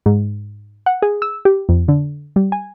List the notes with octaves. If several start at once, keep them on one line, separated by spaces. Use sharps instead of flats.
G#2
F#5
G#4
E6
G4
F2
D3
G3
G#5